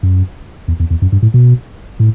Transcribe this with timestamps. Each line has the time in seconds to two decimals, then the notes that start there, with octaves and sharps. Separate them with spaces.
0.03 F#2
0.68 E2
0.80 E2
0.90 E2
1.02 F#2
1.12 G2
1.22 A2
1.34 B2
2.00 A2